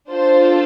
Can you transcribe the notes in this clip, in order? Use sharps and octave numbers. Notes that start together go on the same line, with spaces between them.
D4 F4 A4 C5